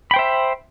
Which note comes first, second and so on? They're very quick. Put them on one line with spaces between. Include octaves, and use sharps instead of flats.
B5 G5 C5 E5